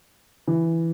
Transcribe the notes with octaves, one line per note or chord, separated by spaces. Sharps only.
E3